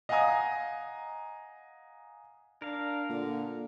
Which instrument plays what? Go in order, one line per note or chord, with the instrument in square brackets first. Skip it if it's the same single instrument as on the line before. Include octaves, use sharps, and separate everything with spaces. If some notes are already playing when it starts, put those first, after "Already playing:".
[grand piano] D#5 F5 F#5 G#5 A#5 D#6
[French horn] D4 [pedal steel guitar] A#4 F5
[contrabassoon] A#2 [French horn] D3